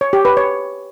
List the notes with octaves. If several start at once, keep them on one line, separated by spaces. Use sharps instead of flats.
C#5
G4
B4
C#5